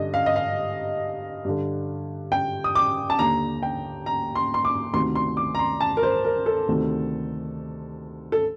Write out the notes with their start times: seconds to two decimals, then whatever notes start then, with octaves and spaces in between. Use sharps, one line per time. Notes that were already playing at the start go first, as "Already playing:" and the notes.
Already playing: G2 D3 D#5
0.14 F5
0.26 D#5
0.36 F5
1.45 G2 D3
2.32 G5
2.64 D#6
2.75 D6
3.10 A5
3.19 D#2 D3 A#5
3.63 G5
4.06 A#5
4.35 C6
4.54 C6
4.65 D6
4.93 D2 C3 D#3 C6
5.15 C6
5.37 D6
5.55 A#5
5.59 C6
5.81 A5
5.97 A#4
6.03 C5
6.25 A#4
6.46 A4
6.68 D2 C3 D#3
8.32 A4